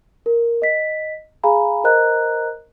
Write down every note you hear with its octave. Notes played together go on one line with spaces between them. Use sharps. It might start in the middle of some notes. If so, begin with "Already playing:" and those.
A#4
D#5 B6
G#4 F5 G#5 A#5 B5
A#4 C5 D#5 A#5 F#6